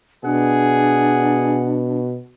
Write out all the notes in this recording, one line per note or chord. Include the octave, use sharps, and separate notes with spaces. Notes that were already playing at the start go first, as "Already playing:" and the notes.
B2 D4 G#4 F#5